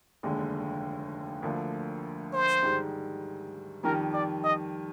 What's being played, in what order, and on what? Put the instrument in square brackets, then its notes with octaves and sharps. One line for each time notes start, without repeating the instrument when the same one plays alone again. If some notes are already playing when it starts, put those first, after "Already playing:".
[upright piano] F1 D#2 D3 G#3
D2 D3 F3 A#3
[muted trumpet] C5
[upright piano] G#2 D#3 G3
[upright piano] F2 D#3 G3 [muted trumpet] A#4
[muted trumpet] D5
D#5